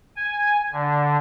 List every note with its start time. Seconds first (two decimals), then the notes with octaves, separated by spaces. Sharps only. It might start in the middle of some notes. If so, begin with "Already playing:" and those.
0.16 G#5
0.73 D3